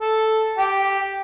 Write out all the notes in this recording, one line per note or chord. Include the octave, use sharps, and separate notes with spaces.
A4
G4